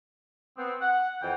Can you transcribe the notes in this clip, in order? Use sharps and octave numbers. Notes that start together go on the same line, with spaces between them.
B3 C4
F#5
F2 E3 F#5 G5